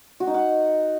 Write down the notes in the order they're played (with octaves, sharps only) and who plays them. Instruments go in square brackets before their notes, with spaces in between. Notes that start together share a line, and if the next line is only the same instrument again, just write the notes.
[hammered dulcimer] F#4
D#4
F#5